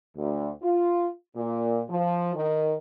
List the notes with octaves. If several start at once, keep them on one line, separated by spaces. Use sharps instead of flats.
D2
F4
A#2
F3
D#3